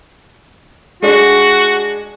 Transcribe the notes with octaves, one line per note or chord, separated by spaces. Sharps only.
G#3 D4 F#4